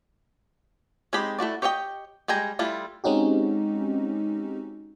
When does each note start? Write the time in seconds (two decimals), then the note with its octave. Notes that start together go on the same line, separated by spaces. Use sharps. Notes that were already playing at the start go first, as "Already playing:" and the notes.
1.13 G#3 C4 D#4 G4 B5
1.39 A3 E4 F#4 D5
1.62 G4 C#5 D#5 E5 G5
2.28 G3 G#3 G5 G#5 A#5
2.59 G3 A3 E4 F4
3.04 G#3 C4 C#4 D#4 F#4 G4